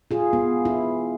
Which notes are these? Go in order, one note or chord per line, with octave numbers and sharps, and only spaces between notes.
F4 G#4
B3
E4